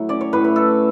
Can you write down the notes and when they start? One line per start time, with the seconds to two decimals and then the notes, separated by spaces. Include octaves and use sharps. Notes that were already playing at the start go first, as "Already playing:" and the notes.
Already playing: A2 F#3 E4
0.09 C#4 D5
0.21 C#5
0.33 A2 B4
0.44 B4
0.56 E4 A4